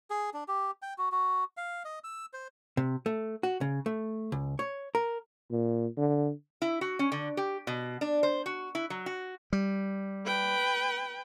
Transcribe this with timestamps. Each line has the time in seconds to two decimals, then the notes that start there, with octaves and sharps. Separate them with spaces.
0.10 G#4
0.34 D4
0.48 G4
0.82 G5
0.98 F#4
1.12 F#4
1.57 F5
1.85 D#5
2.04 E6
2.33 C5
2.77 C3
3.06 A3
3.43 F#4
3.61 C#3
3.86 A3
4.32 C#2
4.59 C#5
4.95 A#4
5.51 A#2
5.97 D3
6.62 E4
6.81 F#4
6.99 C#4
7.12 D3
7.37 G4
7.67 B2
8.01 D4
8.23 C5
8.46 F#4
8.75 E4
8.90 F#3
9.06 F#4
9.53 G3
10.26 B4 G5